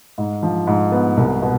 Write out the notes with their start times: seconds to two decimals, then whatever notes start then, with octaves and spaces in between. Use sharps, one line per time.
0.18 G#2
0.43 F3
0.67 G#2
0.92 B3
1.17 C2
1.42 B2